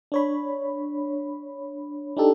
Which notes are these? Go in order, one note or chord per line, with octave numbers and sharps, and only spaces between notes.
D4 C#5 B5
D4 D#4 G4 A4